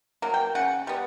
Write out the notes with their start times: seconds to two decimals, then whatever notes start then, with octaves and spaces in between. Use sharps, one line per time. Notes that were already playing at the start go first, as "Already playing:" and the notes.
0.22 F#3 A#3
0.34 G5
0.55 C#3 F#5
0.87 G3 B3